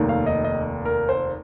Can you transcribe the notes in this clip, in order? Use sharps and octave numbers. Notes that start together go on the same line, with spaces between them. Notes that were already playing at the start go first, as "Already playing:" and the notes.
Already playing: F1 D#2 D#3
F5
D#5
D#5
A#4
C5